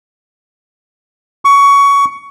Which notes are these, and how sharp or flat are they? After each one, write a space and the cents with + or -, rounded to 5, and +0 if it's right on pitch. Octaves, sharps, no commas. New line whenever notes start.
C#6 +20